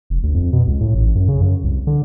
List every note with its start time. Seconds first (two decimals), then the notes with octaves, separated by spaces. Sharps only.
0.10 F1
0.23 D2
0.34 F2
0.53 B2
0.67 C#2
0.81 A2
0.95 A1
1.15 F#2
1.28 C#3
1.42 F#2
1.64 C2
1.87 D3